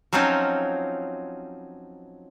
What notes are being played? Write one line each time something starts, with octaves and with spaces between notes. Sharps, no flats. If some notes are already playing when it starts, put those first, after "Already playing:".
F3 F#3 C4 C#4 D#4 F4